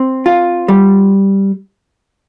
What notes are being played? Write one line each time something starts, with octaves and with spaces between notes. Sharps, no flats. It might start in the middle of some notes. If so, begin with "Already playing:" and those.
Already playing: C4
F4
G3